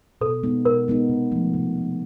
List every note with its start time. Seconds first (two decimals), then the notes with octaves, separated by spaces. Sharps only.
0.21 B2 A4
0.43 G#3 B3 D#4
0.65 B2 A#4
0.88 G#3 B3 D#4
1.09 C3
1.32 F3 A3
1.54 C3
1.76 F3 A3